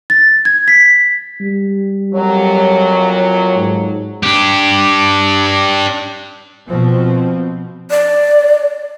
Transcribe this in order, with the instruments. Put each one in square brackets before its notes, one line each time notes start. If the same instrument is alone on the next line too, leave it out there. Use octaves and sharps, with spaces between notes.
[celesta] A6
G#6
B6
[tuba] G3
[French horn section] F2 A#2 F#3
[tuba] G#2
[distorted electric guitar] D4 G4
[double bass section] B2 F3 C4
[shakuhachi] D5